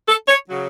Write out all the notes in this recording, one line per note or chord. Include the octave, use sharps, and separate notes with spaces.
A4
C#5
C#3 F#3